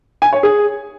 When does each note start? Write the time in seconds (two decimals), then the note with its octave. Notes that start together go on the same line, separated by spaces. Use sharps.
0.22 G#5
0.33 C#5
0.43 G#4